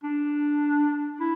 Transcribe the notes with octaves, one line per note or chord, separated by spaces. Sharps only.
D4
E4